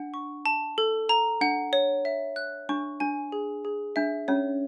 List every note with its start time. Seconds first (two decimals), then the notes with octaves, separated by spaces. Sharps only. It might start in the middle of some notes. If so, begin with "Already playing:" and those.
Already playing: D4 F#5
0.14 C#6
0.46 A5
0.78 A4
1.09 A#5
1.41 D4 F#5
1.73 C#5
2.05 E5
2.36 F#6
2.69 D4 C#6
3.00 D4 G#5
3.32 G#4
3.65 G#4
3.96 D4 E5
4.28 C#4 C#5